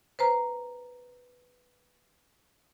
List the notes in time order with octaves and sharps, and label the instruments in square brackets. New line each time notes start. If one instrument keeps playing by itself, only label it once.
[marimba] B4 C5 A#5